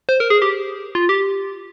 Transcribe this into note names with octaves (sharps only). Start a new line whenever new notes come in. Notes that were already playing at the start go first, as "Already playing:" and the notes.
C5
A#4
G#4
G4
F4
G4